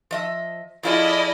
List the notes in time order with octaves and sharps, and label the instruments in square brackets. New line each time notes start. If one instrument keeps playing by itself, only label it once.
[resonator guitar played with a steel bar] F3 D#5 E5
[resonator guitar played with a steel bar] F2 F4 G#4 [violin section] E4 D5 D#5